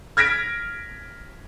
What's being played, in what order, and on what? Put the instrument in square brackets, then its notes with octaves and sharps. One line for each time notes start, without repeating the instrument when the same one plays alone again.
[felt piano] F6 G#6 A#6 B6 D7